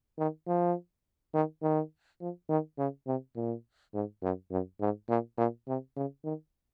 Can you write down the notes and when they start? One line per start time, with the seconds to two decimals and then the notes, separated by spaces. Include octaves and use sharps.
0.18 D#3
0.47 F3
1.34 D#3
1.62 D#3
2.21 F3
2.49 D#3
2.78 C#3
3.07 C3
3.36 A#2
3.94 G#2
4.22 F#2
4.51 F#2
4.81 G#2
5.09 A#2
5.38 A#2
5.67 C3
5.96 C#3
6.24 D#3